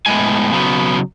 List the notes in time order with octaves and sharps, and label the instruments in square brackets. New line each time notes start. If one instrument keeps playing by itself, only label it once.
[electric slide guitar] A2 G#3 B3 G#5
C#3 F#3 B3